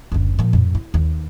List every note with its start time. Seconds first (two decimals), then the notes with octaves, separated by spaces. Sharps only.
0.12 F#1 D2
0.39 A#2 F3
0.53 F2 A2
0.75 E4
0.94 D#2